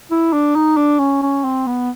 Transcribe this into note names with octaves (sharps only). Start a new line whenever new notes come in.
E4
D4
D#4
D4
C#4
C#4
C4
B3